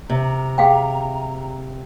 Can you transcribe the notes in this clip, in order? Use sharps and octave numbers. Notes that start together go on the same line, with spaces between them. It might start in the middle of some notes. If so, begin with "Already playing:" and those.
C3 A#5
G#4 F5 G5